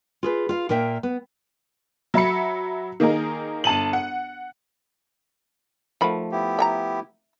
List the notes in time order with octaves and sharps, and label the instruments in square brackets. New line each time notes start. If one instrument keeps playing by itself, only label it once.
[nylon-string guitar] F4 G#4 B4
F4 F5
A#2 A#3 A#4 E5 G5
B3
[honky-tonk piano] F#3 E5 B5 C#7
D#3 A#3 D#4 G#4 A#4
G1 A5 D#7 F#7
F#5
[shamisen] D#3 F#4 B5 [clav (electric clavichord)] F3 A3
[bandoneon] B3 E4 G4
[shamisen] E5 G#5 A#5